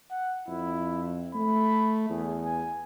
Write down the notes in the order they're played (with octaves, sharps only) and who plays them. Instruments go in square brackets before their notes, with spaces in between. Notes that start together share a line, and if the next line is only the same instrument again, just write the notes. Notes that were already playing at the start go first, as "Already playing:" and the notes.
[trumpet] F#5
[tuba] F2 [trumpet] E4
[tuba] A3 [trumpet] B5
[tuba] E2 [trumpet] G#4
[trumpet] G#5